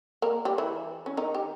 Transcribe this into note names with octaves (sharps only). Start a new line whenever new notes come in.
A#3 A#4
G3 G4
E3 E4
C#4
D#3 D#4
G4